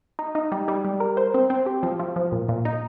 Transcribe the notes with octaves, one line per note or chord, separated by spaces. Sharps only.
D#4
D#4
G3
G3
G3
A#4
C5
C4
C4
G4
F3
F3
F3
A#2
A#2
D#4